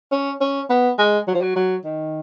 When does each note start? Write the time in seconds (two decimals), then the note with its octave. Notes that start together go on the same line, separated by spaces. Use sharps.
0.12 C#4
0.41 C#4
0.70 B3
0.99 G#3
1.28 F#3
1.34 F3
1.42 F#3
1.56 F#3
1.85 D#3